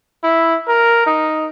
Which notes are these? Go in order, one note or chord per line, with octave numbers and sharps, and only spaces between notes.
E4
A#4
D#4